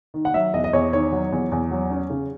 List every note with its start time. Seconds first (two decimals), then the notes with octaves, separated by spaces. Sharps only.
0.14 D#3
0.25 F#5
0.34 F#3 E5
0.54 E2 D#5
0.64 D#5
0.73 E2 C#5
0.93 D#3 C#5
1.12 F#3
1.32 E2
1.52 E2
1.71 F#3
1.91 C#4
2.10 C#3